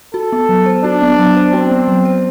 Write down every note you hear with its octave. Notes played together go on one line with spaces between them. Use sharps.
F#4 A4
B3
F#3
C5
D4 F#4
B3
F#3
C5
C4 F#4
B3
F#3
C5